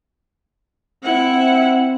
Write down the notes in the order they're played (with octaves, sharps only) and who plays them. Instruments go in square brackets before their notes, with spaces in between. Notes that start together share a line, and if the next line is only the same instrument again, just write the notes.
[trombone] C4 [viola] E4 F#5